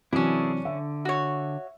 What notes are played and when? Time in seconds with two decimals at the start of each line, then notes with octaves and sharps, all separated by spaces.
0.13 C3 E3 F#3 C#4 D4 E4 G#4 A4
0.65 D3 E5
1.05 F#4 C#5